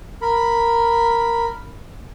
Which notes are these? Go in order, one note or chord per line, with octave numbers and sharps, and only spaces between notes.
A#4 B5